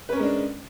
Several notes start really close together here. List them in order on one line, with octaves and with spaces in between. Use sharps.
B4 C#4 A#4 G#3 D4